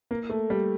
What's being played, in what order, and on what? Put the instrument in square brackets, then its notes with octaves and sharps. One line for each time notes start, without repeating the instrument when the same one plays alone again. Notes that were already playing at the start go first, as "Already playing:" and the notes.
[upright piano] A#3
A3
G3